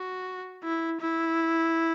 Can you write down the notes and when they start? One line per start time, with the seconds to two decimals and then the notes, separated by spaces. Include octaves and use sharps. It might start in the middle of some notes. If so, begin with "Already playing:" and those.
Already playing: F#4
0.63 E4
1.01 E4